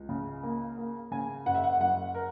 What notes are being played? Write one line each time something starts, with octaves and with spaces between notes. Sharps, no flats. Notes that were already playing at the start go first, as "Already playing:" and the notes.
Already playing: C#2
C#3
A#3
A#3
C#3 G#5
F#1 F#5
E5
F#5
F#2 F#5
A#4